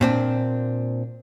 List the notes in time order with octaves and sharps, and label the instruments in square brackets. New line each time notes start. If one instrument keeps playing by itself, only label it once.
[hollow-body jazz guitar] A#2 C4 D4